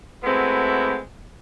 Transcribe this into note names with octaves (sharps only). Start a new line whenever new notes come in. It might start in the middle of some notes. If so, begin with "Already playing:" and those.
G#3 A3 B3 C4 E4 F#4